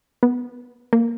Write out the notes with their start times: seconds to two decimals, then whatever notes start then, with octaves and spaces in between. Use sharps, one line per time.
0.23 B3
0.93 A#3